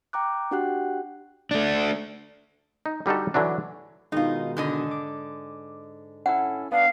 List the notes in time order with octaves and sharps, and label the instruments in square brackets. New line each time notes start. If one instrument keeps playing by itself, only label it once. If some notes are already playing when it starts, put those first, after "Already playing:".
[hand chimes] G5 A#5 D6 F#6
D4 F#4 G4 F#5 G5 F#6
[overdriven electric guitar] A3 D4
[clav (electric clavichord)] D#4
D3 G3 D#4 F#4 A4
D3 E3 F#3 D4
[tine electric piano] B2 D#3 G#3 [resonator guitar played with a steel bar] D#4 F4
[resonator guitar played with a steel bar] G#2 D3 D#5
[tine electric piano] D6
[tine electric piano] C#4 E4 A4 [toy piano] F#5
[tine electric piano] B3 D4 [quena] F5